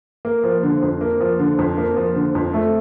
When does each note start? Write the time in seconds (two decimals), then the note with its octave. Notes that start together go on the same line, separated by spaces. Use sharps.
0.25 A#3
0.44 F3
0.63 D3
0.82 F2
1.01 A#3
1.20 F3
1.39 D3
1.59 F2
1.78 A#3
1.97 F3
2.16 D3
2.35 F2
2.54 A3